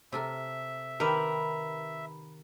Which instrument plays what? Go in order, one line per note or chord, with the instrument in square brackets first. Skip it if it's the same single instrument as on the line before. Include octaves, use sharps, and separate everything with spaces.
[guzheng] C3 A4 A#4 [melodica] E5
[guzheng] D#3 G4 [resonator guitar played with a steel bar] A#4 [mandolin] B4 B5 E6